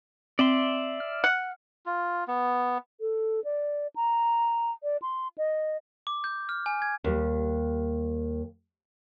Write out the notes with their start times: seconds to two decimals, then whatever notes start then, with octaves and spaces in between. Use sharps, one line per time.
0.39 C4 D5 E5 C6
1.00 F6
1.24 F#5
1.86 F4
2.28 B3
3.00 A4
3.44 D5
3.96 A#5
4.83 D5
5.02 C6
5.38 D#5
6.07 D6
6.24 G6
6.49 F6
6.66 G#5
6.82 G#6
7.04 D#2 G3